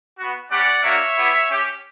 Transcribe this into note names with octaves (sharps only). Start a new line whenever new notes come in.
B3 F#4
G3 C#4 G4 D5 F#5
A#3 D4 F#4 C#5 E5
B3 E4 G4
C#4 G4